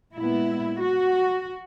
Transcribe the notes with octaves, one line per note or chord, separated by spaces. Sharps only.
A#2 G#3 B3 E4
F#4